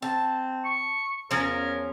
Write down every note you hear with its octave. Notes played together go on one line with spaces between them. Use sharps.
C4 A5
C#6
E2 F3 C#4 A#4